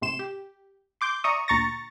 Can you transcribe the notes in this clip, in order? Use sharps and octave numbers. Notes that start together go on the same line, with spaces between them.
A1 C3 C6 E7
G4
C6 D6 G6
D5 E5 A#5 C#6 D#6
D2 A#2 A#5 C#6 A6 A#6